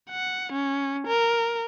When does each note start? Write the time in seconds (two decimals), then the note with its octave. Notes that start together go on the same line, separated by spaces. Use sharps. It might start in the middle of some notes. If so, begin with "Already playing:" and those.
0.11 F#5
0.53 C#4
1.07 A#4